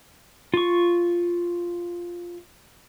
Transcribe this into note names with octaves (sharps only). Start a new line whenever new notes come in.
F4 C#6